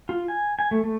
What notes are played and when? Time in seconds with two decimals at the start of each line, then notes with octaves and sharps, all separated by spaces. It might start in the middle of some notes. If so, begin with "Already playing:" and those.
0.09 F4
0.28 G#5
0.59 G#5
0.71 A3
0.84 A3